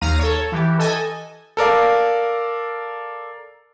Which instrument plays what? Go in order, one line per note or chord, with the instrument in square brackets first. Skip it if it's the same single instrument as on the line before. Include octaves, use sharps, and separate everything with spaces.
[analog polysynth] D#2 F5 A#5 D#7
A4 C#5
E3 G4
A4 D#5 G#5
[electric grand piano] A4 A#4 D5 F5